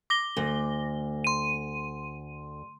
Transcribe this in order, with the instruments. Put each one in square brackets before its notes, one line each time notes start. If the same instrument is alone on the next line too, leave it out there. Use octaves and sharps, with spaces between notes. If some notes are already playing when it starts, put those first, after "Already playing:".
[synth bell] D6 A#6 G7
[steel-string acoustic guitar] D2
[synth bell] C6 D#7